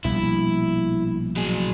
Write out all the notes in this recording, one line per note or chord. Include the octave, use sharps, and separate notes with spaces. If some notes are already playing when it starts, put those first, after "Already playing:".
A#1 B2 G3 E4
F#3 G#4